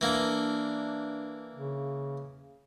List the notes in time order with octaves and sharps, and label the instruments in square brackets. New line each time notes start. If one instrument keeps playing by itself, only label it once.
[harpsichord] E3 A#3 [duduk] D4
[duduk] C#3